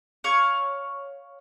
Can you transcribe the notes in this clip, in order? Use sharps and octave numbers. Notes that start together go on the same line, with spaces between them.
C#5 F5 C#6